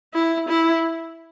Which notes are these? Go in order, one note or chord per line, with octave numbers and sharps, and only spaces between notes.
E4
E4